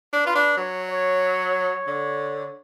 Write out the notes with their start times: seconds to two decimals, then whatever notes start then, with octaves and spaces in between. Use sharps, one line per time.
0.13 D4
0.24 F4 B4
0.35 D4
0.57 F#3 C#5
0.90 C#5
1.87 D3